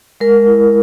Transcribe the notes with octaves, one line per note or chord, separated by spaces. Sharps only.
G#3 A#4
E4